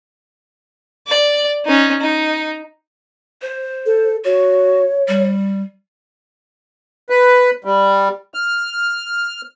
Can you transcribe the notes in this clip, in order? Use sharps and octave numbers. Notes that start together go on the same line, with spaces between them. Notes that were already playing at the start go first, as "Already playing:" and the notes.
D5
C#4 D#4
D#4
C5
A4
F#4 C#5
G3
B4
G3
F6